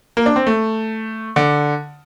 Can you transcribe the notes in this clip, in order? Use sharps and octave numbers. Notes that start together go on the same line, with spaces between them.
A#3
D4
C4
A3
D3